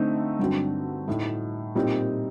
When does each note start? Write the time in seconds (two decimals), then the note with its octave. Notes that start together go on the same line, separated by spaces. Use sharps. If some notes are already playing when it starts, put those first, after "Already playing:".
Already playing: D3 A3 C4 D#4
0.39 G2 D3 F#3 C4
1.08 A2 A3 D#4
1.75 A#2 G3 C4 D#4